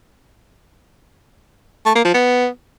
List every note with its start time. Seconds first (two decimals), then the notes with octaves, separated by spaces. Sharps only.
1.86 A3
1.95 A#3
2.05 F3
2.14 B3